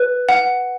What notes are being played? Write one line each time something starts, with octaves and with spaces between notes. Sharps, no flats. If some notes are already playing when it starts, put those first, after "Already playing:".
Already playing: B4
F#5